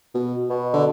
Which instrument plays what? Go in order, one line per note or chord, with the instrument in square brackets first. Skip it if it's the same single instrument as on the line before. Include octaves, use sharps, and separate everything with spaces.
[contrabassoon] B2
[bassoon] B2
[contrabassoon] D3